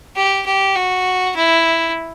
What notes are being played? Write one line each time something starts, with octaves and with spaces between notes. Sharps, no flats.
G4
G4
F#4
E4